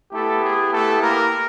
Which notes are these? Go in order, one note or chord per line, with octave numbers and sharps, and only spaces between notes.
A3 B3 E4 G4 A4
G#4
A3 A4
A#3 A#4